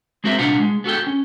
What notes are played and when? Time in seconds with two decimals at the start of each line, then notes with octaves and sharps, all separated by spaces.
0.24 G#3 C4 F#4 A#4 C5 E5
0.39 C2 A#2 D4 F4 B4 F#5
0.60 G#3
0.84 B3 F#4 A4 G5
1.06 C#4